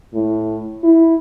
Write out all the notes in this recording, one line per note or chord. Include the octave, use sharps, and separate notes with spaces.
A2
E4